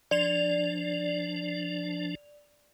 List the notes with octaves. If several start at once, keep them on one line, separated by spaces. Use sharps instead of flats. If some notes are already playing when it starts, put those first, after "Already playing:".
F3 D4 D5 F7